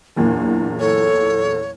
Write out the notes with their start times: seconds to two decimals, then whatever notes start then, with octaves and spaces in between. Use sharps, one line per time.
0.16 F#1 E2 A#2 D4
0.79 A4 C#5